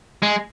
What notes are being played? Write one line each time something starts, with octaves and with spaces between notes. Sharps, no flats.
G#3